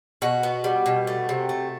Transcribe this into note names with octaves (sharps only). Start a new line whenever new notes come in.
B2 F#4
B3
G3
B2
A3
C3
A3